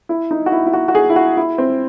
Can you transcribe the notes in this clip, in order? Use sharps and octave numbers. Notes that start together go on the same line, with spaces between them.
E4
D#4
F#4
E4
E4
F#4
F#4
G#4
E4
F#4
E4
C4